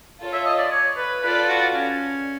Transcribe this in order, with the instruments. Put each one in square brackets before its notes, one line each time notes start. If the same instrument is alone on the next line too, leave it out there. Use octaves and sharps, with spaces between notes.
[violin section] F4 A4 C#5
[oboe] E5
D#5
D5
C#5
B4
[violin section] F4 A4 D5 [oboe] B4
[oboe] F#4
C#4